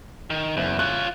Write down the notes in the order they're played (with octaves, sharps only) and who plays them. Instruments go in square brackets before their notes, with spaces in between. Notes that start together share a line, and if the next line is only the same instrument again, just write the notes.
[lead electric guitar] D#3
[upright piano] F#1 [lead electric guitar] E2
[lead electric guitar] F4 C#5 [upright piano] F#6